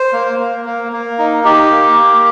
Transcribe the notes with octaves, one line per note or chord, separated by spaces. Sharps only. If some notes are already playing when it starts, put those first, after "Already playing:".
Already playing: C5
A#3
A#3
A#3
A#3
D#4
D#4 G4
A#3
A#3